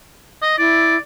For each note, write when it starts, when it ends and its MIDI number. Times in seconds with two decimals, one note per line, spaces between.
0.42 0.54 75
0.58 0.97 64
0.58 0.98 74